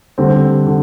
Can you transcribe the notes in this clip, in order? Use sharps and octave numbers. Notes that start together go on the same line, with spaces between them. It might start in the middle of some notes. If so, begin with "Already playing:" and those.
D3 G3 C4
D3